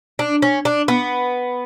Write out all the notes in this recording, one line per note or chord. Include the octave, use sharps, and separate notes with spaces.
D4
C#4
D4
B3